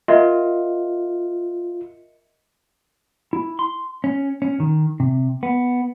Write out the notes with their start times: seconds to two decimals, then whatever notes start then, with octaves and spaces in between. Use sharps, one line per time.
0.08 F4 A#4 D#5 E5
3.33 E4
3.59 C6
4.04 C#4
4.42 C#4
4.60 D#3
5.00 C3
5.43 B3